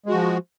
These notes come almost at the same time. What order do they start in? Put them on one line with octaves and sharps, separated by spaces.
G#3 F#4 F3